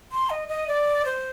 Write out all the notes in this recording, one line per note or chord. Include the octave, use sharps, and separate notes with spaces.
C6
D#5
D#5
D5
C5